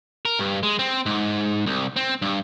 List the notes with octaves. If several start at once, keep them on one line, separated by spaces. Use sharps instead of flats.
A#4
G2
G#3
C4
G#2
C2
C4
G2